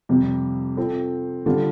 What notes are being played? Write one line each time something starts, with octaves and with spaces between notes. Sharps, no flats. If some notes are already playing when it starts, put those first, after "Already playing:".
F2 C3 G3
F3 C4 A4
D3 G3 F4 A4